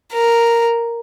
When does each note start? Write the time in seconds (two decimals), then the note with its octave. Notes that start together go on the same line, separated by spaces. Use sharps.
0.12 A#4